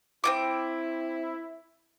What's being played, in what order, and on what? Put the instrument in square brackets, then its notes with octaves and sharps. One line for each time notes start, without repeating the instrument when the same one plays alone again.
[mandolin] C4 F4 D6 [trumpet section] E4